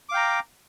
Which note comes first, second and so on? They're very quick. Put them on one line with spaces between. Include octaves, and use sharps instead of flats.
D6 F5 G5 A#5